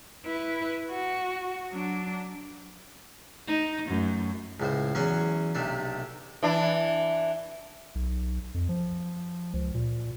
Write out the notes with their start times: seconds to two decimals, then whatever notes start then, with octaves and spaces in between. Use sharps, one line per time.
0.26 E4 B4
0.90 F#4
1.71 F#3 D4
3.47 D#4
3.87 F#2 A3
4.60 C#2 A2 C5
4.95 E2 F#3 C#4 F#5 C6 C#6
5.55 B1 C3 A3 D4
6.43 E3 D4
7.95 B1
8.54 F2
8.69 F3
9.54 C#2
9.74 A#2